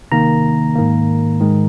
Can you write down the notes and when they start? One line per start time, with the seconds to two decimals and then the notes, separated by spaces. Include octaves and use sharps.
0.12 C3 D#3 A#3 A#5
0.75 G#2 D#3 A#3
1.41 G#2 D#3 G#3